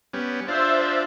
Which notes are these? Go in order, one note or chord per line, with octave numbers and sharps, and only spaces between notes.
G3 B3 C#4
D4 F4 C5 E5